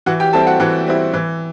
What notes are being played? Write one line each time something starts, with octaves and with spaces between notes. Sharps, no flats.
E3 F#4 F#5
G4 G5
G3 C4 E4 A4 A5
F#4 F#5
E3 F#4 F#5
G3 C4 E4
E3